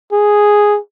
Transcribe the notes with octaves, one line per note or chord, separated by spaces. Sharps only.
G#4